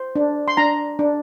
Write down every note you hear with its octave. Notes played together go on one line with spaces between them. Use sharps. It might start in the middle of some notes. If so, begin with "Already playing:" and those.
Already playing: C5
D4
C6
D4 A#5
D4